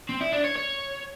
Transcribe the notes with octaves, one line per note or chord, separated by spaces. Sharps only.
C4
E4
D4
C#5
C#5